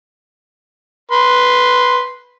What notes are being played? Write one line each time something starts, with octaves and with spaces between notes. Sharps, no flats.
B4 C6